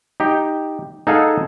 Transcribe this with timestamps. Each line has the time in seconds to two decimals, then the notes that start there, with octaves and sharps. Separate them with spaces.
0.20 D#4 G4 G5
1.07 D#4 G#4 A4 F5 F#5 G#5